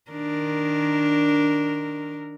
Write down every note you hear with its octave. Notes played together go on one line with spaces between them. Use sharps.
D#3 D4 A#4